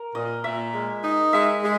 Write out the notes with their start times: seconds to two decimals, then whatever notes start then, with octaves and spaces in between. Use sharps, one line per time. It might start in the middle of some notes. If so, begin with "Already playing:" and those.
Already playing: A#4
0.15 A#2 D#5
0.44 A#2 E5
0.75 G#3
1.03 D#4
1.32 G#3 E5
1.63 G#3